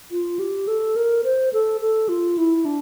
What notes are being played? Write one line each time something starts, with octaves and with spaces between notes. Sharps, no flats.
F4
G4
A4
A#4
C5
A4
A4
F4
E4
D4